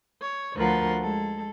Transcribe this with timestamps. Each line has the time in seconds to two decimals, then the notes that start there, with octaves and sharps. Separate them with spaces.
0.22 C#5
0.56 D2 F3 A#4 B4 F#5 C6
1.01 G#3 A4